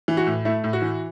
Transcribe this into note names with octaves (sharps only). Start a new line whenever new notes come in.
E3
F#4
A2
A3 E4
A2
F#4
E3